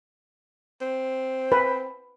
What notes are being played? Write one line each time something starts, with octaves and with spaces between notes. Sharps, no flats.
C4
B4